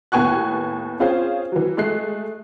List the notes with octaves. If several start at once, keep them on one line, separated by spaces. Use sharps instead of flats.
D#2 A2 B3 G#5 C#6 F#6
C4 C#4 F4 G#4 C5
E3 F#3
G#3 A3 F#6 C7